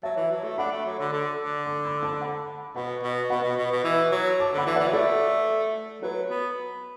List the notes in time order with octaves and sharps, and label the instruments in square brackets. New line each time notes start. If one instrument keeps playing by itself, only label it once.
[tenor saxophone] F#3 [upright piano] E5 A5
[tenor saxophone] E3
F#3
A3
[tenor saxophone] D4 [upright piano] F#5 B5
[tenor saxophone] A3
F#3
D3
D3
D3
[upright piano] A5 D6
B5 E6
A5 D6
F#5 B5
[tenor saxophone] B2 [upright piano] F#5 B5
[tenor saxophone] B2
[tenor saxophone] B2 [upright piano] F#5 B5
[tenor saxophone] B2
B2
B2
E3
F#3
[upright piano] A5 D6
[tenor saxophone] D3 [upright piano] F#5 B5
[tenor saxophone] E3
[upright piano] D5 F#5
[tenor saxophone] E3
F#3
[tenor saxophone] A3 [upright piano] A4 D5
[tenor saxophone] F#3 [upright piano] B4
[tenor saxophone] B3